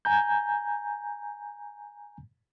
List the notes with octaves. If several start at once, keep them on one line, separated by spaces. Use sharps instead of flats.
G#5 A#5 G6